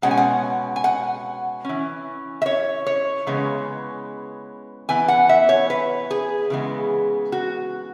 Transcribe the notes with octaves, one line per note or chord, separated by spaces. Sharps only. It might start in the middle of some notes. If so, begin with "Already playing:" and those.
B2 G#3 C#4 F#5
G#5
F#5
G#5
F#5
E3 C#4
E5
C#5
C#5
C#3 E3 G#3 B3
E3 B3 G#5
F#5
E5
C#5
B4
G#4
C#3 E3 G#3 B3
F#4